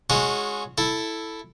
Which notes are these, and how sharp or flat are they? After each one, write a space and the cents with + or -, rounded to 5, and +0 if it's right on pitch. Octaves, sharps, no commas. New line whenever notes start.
G#3 +0 C#4 +0 F#4 -20
E4 +0 A4 +0